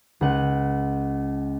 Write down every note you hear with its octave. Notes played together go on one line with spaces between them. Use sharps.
C#2 F#5 D#7